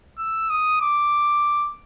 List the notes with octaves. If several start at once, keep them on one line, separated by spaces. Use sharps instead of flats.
E6
D#6
D6